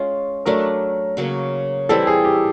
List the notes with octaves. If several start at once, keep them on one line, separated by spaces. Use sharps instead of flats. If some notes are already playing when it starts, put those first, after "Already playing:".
Already playing: G#3 C#4 F4
F#3 A3 D4 A#4
C#3 F#3 A#3
E3 G3 C4 E4 A4
G#4
G4